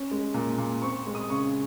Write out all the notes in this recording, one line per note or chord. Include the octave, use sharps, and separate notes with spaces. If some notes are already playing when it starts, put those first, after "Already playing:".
Already playing: C#4
G#3
A#2
A#2
C4 C#6
C#6
G#3
D#6
C#3 C#6